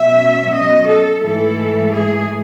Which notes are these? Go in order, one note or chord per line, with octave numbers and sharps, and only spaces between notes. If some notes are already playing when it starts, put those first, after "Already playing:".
Already playing: B2 F#3 C#4 E5
D#5
A4
G#2 E3 A3 A4
G#4